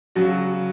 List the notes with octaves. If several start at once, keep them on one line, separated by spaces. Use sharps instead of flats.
C#3 F#3 F#4